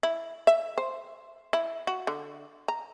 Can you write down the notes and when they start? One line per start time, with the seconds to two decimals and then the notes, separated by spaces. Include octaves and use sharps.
0.03 E4
0.47 E5
0.78 C5
1.53 E4
1.87 F#4
2.07 D3
2.68 A#5